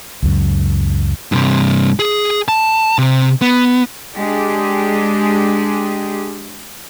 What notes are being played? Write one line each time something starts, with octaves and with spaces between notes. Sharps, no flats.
C#2 F#2
G2 C3
G#4
A5
C3
B3
G#3 D4 G4 G#4